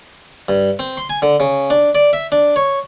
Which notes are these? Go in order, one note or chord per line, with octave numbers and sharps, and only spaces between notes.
G2
C4
C6
G#5
D3
C#3
D4
D5
E5
D4
C#5